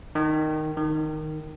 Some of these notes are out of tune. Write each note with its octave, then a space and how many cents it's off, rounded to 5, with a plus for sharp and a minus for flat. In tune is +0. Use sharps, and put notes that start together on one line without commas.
D#3 -5
D#3 -5